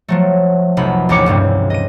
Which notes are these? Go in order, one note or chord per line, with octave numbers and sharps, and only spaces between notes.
F3 F#3 A3
F1 B1 B5
A1 D#2 C#4 D6 C#7
E1 C#2 G2 C4
D#5 D#7